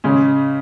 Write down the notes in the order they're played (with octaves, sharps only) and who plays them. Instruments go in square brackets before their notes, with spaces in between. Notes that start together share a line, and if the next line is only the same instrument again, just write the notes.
[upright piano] C#3 G#3 C#4